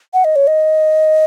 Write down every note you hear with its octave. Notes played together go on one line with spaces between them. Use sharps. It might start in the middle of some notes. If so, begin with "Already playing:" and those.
F#5
D#5
C#5
D#5